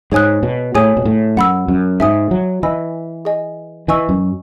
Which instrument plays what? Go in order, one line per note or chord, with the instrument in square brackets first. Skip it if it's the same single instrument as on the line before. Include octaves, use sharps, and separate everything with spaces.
[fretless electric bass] G#2 [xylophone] G#4 C#5 G#5 D#6 F#6
[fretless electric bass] B2
[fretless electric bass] A2 [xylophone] G#4 C#5 G#5 D#6
[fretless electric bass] B2
A2
[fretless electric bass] F#2 [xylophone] F#5 B5 E6
[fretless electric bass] F#2
[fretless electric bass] G#2 [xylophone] E5 G#5 D#6
[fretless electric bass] F#3
[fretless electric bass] E3 [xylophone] D#5 G#5 B5 E6
[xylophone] G#4 D#5 G#5
[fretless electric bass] E3 [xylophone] D#5 G#5 C#6 E6
[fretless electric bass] F#2